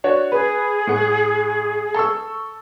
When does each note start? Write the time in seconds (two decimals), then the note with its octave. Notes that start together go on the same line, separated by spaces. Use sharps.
0.04 D4 F#4 C#5
0.32 G#4 B4
0.87 A2 F#5
1.94 A4 C#6 E6